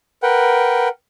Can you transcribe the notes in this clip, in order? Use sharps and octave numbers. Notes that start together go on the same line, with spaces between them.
A#4 B4 F#5 G5